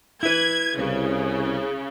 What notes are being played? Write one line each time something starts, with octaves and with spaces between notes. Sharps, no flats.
E4 B4 G#6
C2 C#3